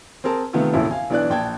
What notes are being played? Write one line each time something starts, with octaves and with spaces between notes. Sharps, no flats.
C4 G#4 A#4 A5
C3 D#3 A3 B3 F4
E1 A#1 A2 C#3 E4 A5
F5 G#5
B1 E3 D4 D5 F#6
A#1 G5 A5 G#6